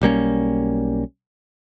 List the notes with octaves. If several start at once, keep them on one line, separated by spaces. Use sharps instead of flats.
B1 G3 A#3 C#4